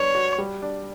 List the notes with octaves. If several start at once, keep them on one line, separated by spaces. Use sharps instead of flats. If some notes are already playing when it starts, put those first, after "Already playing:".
Already playing: G3 B3 D4 C#5
F#4
G3
D4